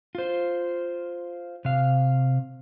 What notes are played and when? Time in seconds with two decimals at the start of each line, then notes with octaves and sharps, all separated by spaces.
0.15 F4 C5
1.65 C3 F5